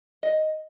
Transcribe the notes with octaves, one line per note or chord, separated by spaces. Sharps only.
D#5